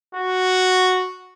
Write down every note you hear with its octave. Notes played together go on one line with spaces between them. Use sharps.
F#4